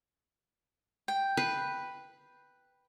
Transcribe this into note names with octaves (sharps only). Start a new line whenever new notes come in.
G5
B4